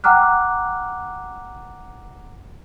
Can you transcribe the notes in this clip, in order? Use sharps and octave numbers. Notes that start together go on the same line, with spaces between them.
F#5 G5 A#5 D6 F6 F#6